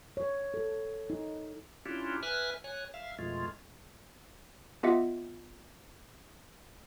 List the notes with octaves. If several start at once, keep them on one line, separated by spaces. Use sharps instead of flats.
C#5
A4
D#4
C#4 D4 E4 F4 G4
B4 E5 G#5 F6 F#6
C#5 G#5 F#6
E5 F5
F2 B2 G#3 A3 F4
B3 F4 G4 D#5 E5 F#5